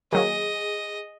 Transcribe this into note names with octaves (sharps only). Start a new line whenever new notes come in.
D#3 F#3 A#3 G#4 D#5